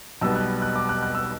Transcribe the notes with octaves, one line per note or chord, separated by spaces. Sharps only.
B1 B2 G3 B3 E6
F#6
F#6
D6
F#6
F#6
E6